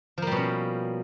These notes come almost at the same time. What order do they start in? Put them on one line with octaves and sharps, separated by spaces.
F3 A#3 G3 B2 C#4